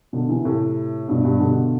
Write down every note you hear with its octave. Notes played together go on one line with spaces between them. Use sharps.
B2 D3
C3 E3
A2 C3
G2 B2
G2 B2
B2 D3